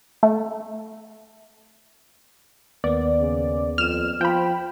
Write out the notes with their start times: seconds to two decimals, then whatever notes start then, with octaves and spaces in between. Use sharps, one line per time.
0.23 A3
2.84 D#2 A#3 B3 D5
3.20 C#3
3.78 F2 F6 E7
4.21 F3 G5 B5